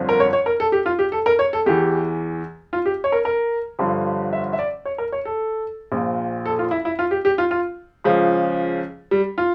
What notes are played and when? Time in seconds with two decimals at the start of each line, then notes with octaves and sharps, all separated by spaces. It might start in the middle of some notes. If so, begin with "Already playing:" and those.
Already playing: G1 F2 D3 F3
0.09 A#4
0.20 C#5
0.33 C#5
0.46 A#4
0.60 A4
0.72 G4
0.86 F4
0.99 G4
1.12 A4
1.26 A#4
1.39 C#5
1.53 A4
1.66 E2 E3 G4
2.73 F4
2.86 G4
3.04 C#5
3.12 A#4
3.25 A#4
3.79 G1 G2 D3 F3
4.33 E5
4.53 E5
4.59 D5
4.85 C#5
4.98 A#4
5.12 C#5
5.25 A4
5.92 A#1 A#2 F3
6.46 A4
6.59 F4
6.71 E4
6.85 E4
6.99 F4
7.11 G4
7.25 G4
7.38 F4
7.51 F4
8.04 C#2 C#3 F3
9.11 G3
9.38 F4